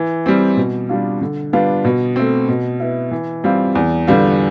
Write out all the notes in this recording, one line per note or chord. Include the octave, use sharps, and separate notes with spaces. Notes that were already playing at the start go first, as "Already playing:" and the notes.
Already playing: E3
G3 C4
B2
G3 D4 F4
D3
G3 B3 D4 F4
B2
A3 C4
B2
B3 E4
E3
G3 C4 F4
E2
D3 G3 B3 F4